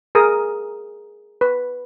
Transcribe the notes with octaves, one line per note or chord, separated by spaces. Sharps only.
G#4 A#4 D#6
B4